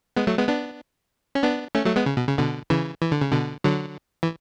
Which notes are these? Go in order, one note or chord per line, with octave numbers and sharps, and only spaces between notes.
G#3 B3
F#3 A3
G#3 B3
B3 D4
C#4
B3 D4
A3 C#4
F#3 A3
G#3 B3
C#3
B2
C#3
B2 D3
C#3 E3
E3
D3
C#3
B2 D3
D3 F#3
E3